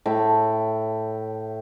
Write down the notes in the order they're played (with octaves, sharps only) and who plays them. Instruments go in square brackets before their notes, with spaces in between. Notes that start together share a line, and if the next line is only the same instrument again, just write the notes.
[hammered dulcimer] A2 E5 G5